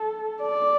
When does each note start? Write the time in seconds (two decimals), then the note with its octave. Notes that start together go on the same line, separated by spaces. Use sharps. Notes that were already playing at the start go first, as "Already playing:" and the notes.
Already playing: A4
0.42 D5